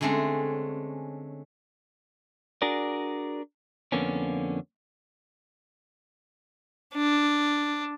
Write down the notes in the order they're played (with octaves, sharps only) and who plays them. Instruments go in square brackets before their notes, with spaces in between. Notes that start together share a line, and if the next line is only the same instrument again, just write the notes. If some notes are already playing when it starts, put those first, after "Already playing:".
[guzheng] D3 G#3 A3 C4 C#4
[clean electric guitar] D4 F#4 G#4 A#4 D5
F2 D3 A#3 B3 C#4
[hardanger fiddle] D4